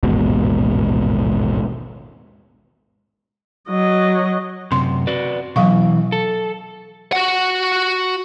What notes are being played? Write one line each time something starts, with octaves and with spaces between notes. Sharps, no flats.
A1 D#2 G#2 B2
F#3 D#5
F#2 C3 C6
F#4 B4 D5
B2 E3 F#3 F5 C#6
A4
F#4 F#5